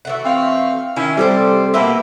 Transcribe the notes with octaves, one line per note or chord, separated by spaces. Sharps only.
E3 A3 F#4
C4 F5
D#3 C#4 E4
C3 G3 A4 B4 C5
B2 E3 A#3 E4 G4 B4